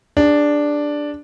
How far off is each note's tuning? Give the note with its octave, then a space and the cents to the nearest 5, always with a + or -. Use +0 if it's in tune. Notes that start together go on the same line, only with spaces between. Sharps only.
D4 +0 G#4 -35